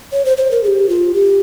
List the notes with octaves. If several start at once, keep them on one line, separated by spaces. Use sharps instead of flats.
C#5
C5
C5
A#4
G#4
G4
F4
G4